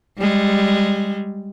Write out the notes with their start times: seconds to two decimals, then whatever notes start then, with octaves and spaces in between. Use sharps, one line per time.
0.19 G3 G#3